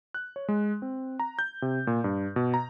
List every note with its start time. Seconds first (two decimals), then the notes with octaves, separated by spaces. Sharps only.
0.14 F#6
0.36 C#5
0.48 G#3
0.82 C4
1.19 A#5
1.39 G6
1.62 C3
1.87 A#2
2.04 G2
2.36 B2
2.54 A#5